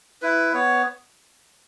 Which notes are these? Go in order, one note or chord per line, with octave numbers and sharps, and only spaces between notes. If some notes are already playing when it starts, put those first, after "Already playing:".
E4 B4
B3 C#5